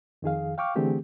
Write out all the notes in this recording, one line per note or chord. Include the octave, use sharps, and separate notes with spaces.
F2 D#3 G#4 F5
F5 G5 C#6 D6 F6
D3 E3 A3 C4 G4 G#4